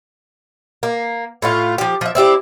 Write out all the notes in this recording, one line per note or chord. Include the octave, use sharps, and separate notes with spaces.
A#3
A2 A3 F4
F3 G4
F3 E5
C4 E4 G4 D5